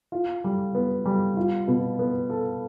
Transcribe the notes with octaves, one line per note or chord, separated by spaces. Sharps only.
F4
G3
B3
G3
F4
B2
B3
A4